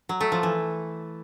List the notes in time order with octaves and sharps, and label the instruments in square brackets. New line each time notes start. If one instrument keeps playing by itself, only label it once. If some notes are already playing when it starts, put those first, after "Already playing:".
[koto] F#3
A3
F3
E3